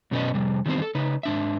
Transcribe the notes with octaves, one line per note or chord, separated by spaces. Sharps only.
F#2 B2 C#4 B4 D5 D#5
F2 C3 G3
D#3 E3 G3 B3 C4 C5
A4
C#3 D#4 B4
G#2 D4 E5